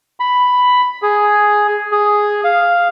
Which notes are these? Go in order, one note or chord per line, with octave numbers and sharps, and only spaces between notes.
B5
G#4
G#4
F5